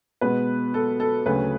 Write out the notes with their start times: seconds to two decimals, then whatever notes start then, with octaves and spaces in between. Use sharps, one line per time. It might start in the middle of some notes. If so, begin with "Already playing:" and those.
0.21 B2 G#3 B3 B4
0.74 A4
1.00 A4
1.26 D2 C#3 F#3 A3 B4